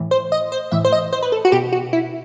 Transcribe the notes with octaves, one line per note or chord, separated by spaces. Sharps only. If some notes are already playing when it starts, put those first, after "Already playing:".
Already playing: A2 E3
C5
D#5
C5
A2 E3 E5
C5
D#5
C5
B4
A4
F#4
B2 G4
F#4
E4